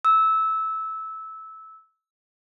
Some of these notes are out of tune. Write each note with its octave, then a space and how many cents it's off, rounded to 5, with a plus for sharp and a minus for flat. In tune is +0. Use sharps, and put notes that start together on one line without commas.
E6 -15